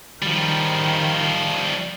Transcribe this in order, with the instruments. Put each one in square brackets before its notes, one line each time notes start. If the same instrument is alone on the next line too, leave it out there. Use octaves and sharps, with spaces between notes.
[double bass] D#3 [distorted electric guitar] F3 G3